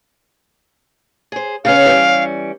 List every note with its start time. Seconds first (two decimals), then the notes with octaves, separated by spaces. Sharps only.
1.32 G#4 C5
1.65 C#3 B3 C#4 F5
1.86 E3 G3 C#4